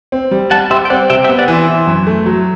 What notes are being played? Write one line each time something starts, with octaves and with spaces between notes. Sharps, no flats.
C4
G3
G3 F#5 A5
G4 C5 E5
G5
C4 D5 F#5
C3 E5 G5
E5 G5
B3
D5 F#5
E3
C5 E5
E3
F#2
A3
F#3